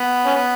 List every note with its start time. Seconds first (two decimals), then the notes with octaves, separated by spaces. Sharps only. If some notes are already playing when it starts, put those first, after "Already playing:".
Already playing: B3
0.26 C#4
0.35 B3